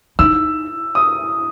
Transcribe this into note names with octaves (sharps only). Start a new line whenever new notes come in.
D#4 E6
D#6